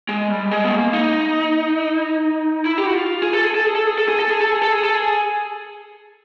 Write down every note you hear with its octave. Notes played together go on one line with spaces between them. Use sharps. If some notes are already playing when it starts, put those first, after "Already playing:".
G#3
G3
G#3
B3
A#3
D#4
E4
G4
F#4
F4
G#4
A4
G#4
A4
G#4
A4
G#4
A4
G#4
A4
G#4
A4
G#4
A4
G#4
A4
G#4